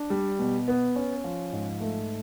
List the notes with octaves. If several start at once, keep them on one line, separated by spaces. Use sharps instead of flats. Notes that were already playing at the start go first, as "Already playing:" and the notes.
Already playing: D4
G3
B2
B3
C#4
F3
G#2
A3